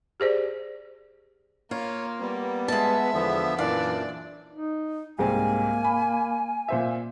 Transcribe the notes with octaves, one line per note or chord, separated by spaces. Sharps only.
G4 G#4 C5 D5
A#3 F4 C#5
G3 B3
G#3 E5 A5
E2 D3 F3 B3
F#2 A#2 E3 D4 D5 F5
D#4
C2 G#2 A#3 C4 G#5
B5
A#2 C5 E5